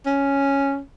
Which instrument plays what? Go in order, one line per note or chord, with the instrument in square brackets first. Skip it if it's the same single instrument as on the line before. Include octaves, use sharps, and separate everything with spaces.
[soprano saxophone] C#4